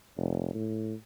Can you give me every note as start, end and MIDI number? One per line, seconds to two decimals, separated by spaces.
0.17 0.50 29
0.54 0.94 45